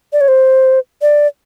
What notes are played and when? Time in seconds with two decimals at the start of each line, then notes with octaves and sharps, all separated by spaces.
0.13 D5
0.21 C#5
0.28 C5
1.02 D5